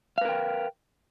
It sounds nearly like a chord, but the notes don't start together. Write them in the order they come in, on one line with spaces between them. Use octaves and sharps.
F5 B4 A#4 G5